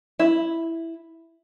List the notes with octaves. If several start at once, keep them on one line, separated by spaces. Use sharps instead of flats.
E4